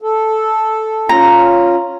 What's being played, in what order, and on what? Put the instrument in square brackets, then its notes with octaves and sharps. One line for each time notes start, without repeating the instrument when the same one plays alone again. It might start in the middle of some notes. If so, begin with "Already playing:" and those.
[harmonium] A4
[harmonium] C#4 F4 [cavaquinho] A#5